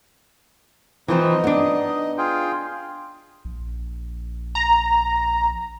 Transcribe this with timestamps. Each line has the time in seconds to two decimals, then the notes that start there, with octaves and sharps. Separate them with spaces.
1.08 E3 F3 C4 D#4 D#5
1.44 B3 D4
2.18 F4 G#4 G5
3.45 A#1
4.55 A#5